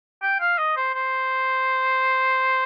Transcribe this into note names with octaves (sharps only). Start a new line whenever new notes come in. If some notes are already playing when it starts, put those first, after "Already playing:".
G5
F5
D#5
C5
C5